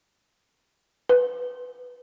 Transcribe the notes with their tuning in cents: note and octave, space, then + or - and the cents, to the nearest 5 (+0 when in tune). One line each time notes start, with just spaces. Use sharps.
B4 +0